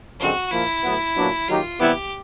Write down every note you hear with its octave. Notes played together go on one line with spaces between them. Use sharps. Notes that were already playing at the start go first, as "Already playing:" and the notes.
F#2 D3 F3 G#3 C4 F#4
A#2 F3 A#3 E4
A2 F#3 B3
A#2 F#3 B3 D4
D#3 F#3 A#3 D#4 F4 G4
C3 E3 G3 B3 E4 G4